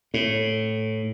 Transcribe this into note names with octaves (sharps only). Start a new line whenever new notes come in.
A2